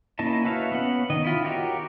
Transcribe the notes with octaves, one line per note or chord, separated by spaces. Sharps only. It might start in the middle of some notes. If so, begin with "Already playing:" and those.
A#3 C#4 E4 D#5 A5
F#4 B4 C#5 E5 F5
B3 C#4 F#5
D#3 D#5
E4 F4
F#4 G4 A#4 C#5